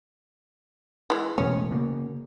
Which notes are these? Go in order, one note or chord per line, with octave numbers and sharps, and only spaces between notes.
E3 G#3
E1 F2 A3 C#4
C#3 A#3